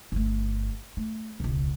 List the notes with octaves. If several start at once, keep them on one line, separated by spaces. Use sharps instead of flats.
G1 A3
A3
E1 C#2